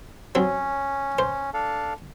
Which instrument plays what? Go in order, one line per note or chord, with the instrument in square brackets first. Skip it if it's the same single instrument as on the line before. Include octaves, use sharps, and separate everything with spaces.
[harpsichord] F#3 C4 [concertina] C#4
[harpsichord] C5
[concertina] D4 A4 F5